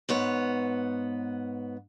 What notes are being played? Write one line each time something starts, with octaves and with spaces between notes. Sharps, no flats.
G#2 B3 C#5